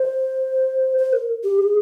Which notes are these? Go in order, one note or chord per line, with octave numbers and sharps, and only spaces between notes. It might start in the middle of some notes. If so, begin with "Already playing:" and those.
Already playing: C5
C5
A#4
G4
G#4